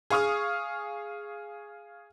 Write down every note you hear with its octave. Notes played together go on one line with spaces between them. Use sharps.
G#4 F5 C#6 D#6 F6